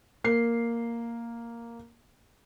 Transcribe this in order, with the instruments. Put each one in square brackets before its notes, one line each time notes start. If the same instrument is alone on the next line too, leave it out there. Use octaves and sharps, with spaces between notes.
[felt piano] A#3 C7